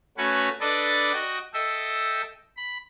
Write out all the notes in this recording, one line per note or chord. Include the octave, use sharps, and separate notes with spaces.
A3 C#4 F#4 B4 C#5
D4 A4 B4 D5 D#5 A5
F#4 D#5 G5
A4 D#5 E5 G5
B5